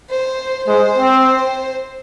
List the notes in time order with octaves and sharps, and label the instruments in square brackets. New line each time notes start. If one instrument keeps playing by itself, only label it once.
[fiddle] C5
[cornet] G#3 [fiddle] C5
[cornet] C4